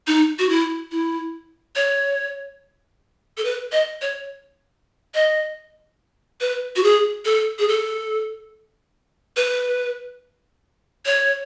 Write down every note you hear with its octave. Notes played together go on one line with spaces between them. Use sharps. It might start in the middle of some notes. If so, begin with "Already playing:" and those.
D#4
F#4
E4
E4
C#5
A4
B4
D#5
C#5
D#5
B4
F#4
G#4
A4
G#4
A4
B4
C#5